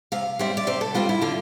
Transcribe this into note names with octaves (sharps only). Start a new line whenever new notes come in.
C3 F5
G3 C4 E5
D5
C3 C5
A4
G3 C4 F4
E4
D3 F4